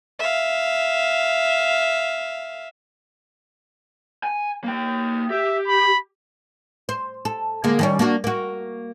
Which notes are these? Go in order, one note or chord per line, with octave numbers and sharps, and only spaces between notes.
E5 F5
G#5
A#3 G5
G4 E5
B5
C5
A4
D3 G#3 A#3
D#3 G3 C#4
A#3 D4 F#4
A#3 F#4